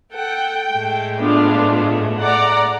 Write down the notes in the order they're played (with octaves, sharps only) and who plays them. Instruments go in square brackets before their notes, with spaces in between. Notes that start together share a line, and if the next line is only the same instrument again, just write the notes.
[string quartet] A4 F#5 [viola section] G5
[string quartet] A2 G#3 A3
[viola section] B3 D4 F4
D5 F#5 A#5